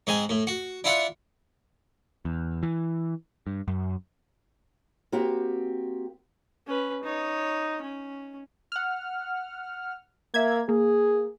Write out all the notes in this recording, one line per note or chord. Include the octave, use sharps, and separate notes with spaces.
G#2 C4 D#5 G#5
A2
F#4
D4 E4 F4 E5 F#5
E2
E3
G2
F#2
A#3 C4 F#4 G4
C#4 B4
D#4 C#5
C#4
F#5 F6
A#3 E5 G#6
A#3 G#4